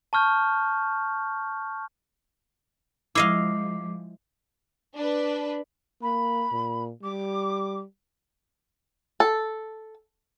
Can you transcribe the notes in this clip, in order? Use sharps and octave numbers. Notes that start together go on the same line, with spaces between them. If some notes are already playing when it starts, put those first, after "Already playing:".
A5 C#6 F6 G6
F3 G#3 E4 D#5 F5 D6 C7
D4 B4
A#3 B5
A#2
G3 D6
A4